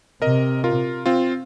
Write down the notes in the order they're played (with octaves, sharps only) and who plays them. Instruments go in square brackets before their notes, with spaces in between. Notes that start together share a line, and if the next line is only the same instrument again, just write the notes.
[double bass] C3 [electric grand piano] A#4 D#5
[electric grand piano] F4 A#4
C4 F4